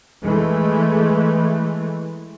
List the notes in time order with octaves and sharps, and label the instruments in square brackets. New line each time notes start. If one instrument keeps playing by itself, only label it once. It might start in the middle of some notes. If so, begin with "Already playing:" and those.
[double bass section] E3 G#3 A3